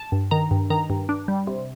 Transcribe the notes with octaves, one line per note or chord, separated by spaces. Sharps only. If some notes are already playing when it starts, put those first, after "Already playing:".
Already playing: A5
G2
D#3 A#5
G2
D#3 A#5
G2
D4
G3
C3